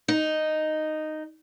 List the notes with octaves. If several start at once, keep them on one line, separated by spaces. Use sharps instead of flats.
D#4